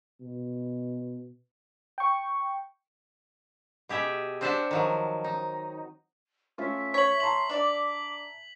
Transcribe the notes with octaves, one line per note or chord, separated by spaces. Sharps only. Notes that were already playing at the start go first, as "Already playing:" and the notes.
B2
G5 C#6
B2 G4 G#4 E5
C4 D4 C5 E5 F#5 A5
D#3 F3 F#3
D#4
A3 C#4 F4 E5
C#5 B6 F#7
E5 A5 A#5 C6 F#7
D4 D5 D6